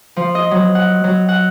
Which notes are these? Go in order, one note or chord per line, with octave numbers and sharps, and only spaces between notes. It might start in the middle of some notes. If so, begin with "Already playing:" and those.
F3
D#5
F#3
F#5
F#3
F#5